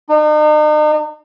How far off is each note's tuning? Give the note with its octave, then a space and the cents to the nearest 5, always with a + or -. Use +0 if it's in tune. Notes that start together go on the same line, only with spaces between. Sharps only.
D#4 -45